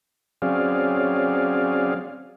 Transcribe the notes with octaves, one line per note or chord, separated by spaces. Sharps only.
F#3 C4 C#4 G#4 D5 F5